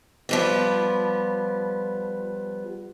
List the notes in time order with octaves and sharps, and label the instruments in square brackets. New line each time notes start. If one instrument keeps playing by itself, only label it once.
[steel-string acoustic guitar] F3 G3 B3